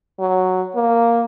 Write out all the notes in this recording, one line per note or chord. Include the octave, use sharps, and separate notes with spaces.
F#3
A#3